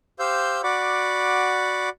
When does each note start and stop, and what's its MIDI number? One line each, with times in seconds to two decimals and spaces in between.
0.19 0.61 67
0.19 0.61 72
0.19 0.61 77
0.19 0.61 88
0.19 0.61 91
0.64 1.89 66
0.64 1.89 74
0.64 1.89 78
0.64 1.89 83
0.64 1.89 86